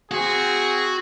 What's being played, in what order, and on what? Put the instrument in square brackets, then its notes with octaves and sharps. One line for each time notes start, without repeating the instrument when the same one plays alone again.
[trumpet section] C4 G#4 [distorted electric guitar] F#4